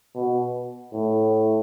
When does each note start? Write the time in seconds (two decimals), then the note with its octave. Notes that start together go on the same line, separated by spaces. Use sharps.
0.16 B2
0.93 A2